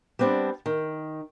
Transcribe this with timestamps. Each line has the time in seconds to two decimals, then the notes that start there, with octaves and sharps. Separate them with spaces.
0.19 G3 B3 C4 D4
0.66 D#3